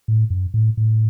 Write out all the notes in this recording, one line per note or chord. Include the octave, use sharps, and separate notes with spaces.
A2
F#2
A2
A2